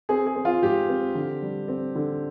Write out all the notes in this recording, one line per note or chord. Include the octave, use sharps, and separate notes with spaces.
C4 G#4
G#4
C4
F4
G#2 G4
C4
D3
G3
C4
D3